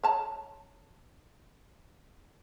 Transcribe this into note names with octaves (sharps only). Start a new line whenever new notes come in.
C#5 A5 A#5